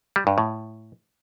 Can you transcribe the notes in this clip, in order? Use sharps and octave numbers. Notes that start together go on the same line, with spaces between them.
G3
G2
A2